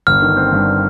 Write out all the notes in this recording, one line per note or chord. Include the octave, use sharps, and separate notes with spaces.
G1 F6
D#3
C4
G2